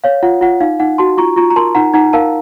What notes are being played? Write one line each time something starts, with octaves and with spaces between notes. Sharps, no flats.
C#5 F5
F4 F#5
F4 F#5
D#4 F5
D#4 F#5
F#4 A5 C6
F4 A#5 C#6
F4 A#5 C#6
A#5
A#4 A5 C6
D#4 F#5 A#5
D#4 F#5 A#5
A#4 F5 A5